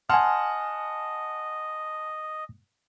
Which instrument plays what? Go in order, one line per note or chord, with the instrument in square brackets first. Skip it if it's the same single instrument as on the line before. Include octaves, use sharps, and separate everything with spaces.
[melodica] D#5 [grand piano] F#5 A5 C6 [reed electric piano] G#5 F6